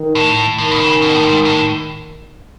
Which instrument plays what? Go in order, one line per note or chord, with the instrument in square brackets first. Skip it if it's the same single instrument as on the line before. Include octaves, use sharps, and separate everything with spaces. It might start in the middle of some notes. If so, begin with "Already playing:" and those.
Already playing: [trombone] D#3
[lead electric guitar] A2
[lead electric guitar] A2 [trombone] D#3
[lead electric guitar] B2
C#3
B2
A2
G#2
A2